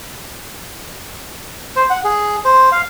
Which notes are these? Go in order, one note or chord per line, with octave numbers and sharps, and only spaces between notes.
C5
F#5
G#4
C5
F5